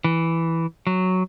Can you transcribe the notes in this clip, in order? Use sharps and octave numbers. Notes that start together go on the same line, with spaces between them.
E3
F#3